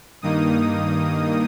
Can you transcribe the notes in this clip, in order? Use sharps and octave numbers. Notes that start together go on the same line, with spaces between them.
G2 D#3 A#3 D#4 D#6